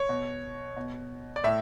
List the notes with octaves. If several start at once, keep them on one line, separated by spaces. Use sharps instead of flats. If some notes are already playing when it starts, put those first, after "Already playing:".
Already playing: C#5
B2
B2
D5
A2 E5